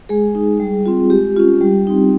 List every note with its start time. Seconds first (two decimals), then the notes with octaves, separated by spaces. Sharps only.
0.09 G#3 G#4
0.35 D#4
0.60 G3
0.86 C4 F4
1.10 G#3 G4
1.37 C#4 F4
1.61 G3
1.87 C4 D#4